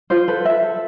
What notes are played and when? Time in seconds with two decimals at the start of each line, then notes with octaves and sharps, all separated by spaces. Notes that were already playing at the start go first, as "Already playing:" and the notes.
0.10 F4 C5
0.28 A4 B4
0.45 A4 E5
0.63 A4